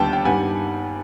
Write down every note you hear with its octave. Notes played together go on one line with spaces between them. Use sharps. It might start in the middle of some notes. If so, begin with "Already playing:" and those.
Already playing: D#2 D3 G3 B3 G5 A5
G5
G2 D#3 G3 B3 F#5 G#5